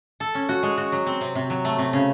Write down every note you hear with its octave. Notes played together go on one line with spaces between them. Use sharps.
A4
C#4
F#4
G#3
F#4
F#3
C4
C3
C3
F#3
A3
C3
C#3